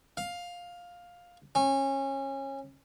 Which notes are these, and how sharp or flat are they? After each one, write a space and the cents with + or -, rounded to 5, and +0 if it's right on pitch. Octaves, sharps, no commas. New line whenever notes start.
F5 +10
C#4 -25